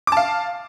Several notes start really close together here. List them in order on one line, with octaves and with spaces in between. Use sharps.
D6 A5 F5